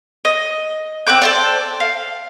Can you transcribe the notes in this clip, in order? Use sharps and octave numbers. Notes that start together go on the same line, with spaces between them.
D#5
C4 F#5 D6 G6
A4 C5 D5
F5